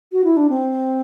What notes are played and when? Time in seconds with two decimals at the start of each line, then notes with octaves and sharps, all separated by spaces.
0.12 F#4
0.24 E4
0.37 D4
0.50 C4